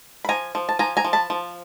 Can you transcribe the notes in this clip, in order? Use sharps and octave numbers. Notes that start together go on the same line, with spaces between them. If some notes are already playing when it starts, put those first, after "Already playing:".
B5
F3 G#5 A#5
F3
A5
F3 G#5 A#5
G#5 A#5
F3
A5 B5
F3